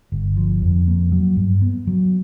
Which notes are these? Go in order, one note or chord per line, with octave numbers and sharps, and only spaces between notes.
G1
F3
F2
A#3
F#3
G2
B3
F#3